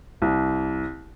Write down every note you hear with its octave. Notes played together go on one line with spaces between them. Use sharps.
C2